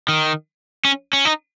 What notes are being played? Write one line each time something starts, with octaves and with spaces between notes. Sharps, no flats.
D#3
C#4
C#4
D#4